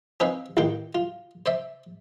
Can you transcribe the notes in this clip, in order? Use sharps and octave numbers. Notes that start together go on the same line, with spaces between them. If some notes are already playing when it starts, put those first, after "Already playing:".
C4 C#4 D#4 B4 C#5 F5
A1 E2 D#3 G5 C6
F4
C5 D5 E5